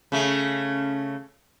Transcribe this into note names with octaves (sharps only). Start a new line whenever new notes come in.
C#3 A3